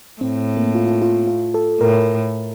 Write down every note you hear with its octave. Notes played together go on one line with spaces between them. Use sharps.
A2 C4
A#3
F4
F4
F4
F4
A4
A2 A#4